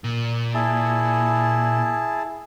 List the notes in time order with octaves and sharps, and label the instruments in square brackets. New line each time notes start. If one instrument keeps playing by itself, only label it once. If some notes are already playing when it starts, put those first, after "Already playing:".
[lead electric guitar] A#2
[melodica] E4 G#4 A5